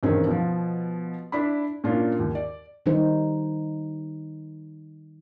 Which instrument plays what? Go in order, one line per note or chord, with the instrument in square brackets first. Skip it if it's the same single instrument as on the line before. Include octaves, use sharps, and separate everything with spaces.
[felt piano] E2 G2 B2 D#3 C4 C#4
B2 F3
D4 E4 B5
A#2 C#4 D4 F4
D#2
D5
[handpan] D#3 G3 D#4 C5